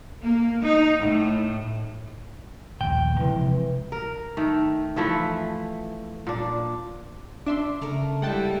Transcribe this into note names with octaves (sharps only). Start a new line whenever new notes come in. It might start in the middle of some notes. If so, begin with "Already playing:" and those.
A#3
D#4
A2
A#1 D#2 A2 G5
C3 E3 F3 G#3
A#4
D#3 A3
E3 F3 A3 E4
A#2 D4
D4 E5 C6 D6
C#3 A3 A#3 A#4
G3 G#3 E4 F#5 G5 A5